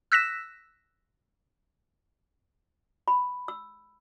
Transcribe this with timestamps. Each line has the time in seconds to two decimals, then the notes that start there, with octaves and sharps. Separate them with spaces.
0.12 E6 F#6 A#6 B6 E7
3.08 B5
3.48 E6